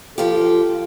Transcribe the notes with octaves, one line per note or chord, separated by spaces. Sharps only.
F3 F4 G4 A4